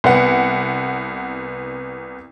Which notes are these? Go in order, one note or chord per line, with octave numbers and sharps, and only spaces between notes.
C2 B3 F#5